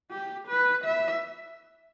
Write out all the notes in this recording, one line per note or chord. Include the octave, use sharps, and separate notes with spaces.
G4
B4
E5